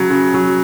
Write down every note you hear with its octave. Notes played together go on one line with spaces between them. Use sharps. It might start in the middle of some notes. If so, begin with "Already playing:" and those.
Already playing: C#3 F#3
C#3
F#3